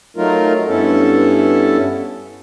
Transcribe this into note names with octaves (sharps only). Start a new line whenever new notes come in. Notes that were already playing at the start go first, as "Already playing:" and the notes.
F#3 A3 D#4 F4 A#4
G2 B3 C#4 E4 A4